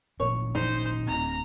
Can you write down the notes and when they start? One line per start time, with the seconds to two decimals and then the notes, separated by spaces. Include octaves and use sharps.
0.20 G#1 A#2 C#5
0.55 D#4 C5
1.07 D1 C4 A#5